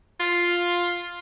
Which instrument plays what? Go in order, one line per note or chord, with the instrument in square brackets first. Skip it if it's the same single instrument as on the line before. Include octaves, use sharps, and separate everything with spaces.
[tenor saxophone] F4